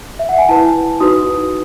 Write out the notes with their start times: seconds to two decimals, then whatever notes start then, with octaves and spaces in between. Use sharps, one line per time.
0.19 E5
0.29 F#5
0.38 G#5
0.48 E4 B4 A5
1.00 D#4 F#4 B4 D#6